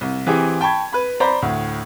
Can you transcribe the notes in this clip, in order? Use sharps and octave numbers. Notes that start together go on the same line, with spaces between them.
C2
E3 C4 G4 G#4
G5 A5 B5 C#6 G#6
B4 B5
C5 D5 A#5 B5
D2 A2